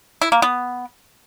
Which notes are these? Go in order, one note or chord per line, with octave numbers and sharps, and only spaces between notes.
E4
A#3
B3